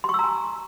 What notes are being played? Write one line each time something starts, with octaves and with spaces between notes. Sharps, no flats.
G#5 A#5 C6 C#6 E6